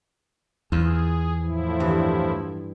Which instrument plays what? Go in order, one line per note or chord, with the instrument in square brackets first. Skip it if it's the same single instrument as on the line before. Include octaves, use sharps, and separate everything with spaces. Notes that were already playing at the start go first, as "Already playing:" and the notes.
[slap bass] E2 [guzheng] F4 [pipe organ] G#4
[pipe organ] A2 F3 E4
[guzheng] G2 E3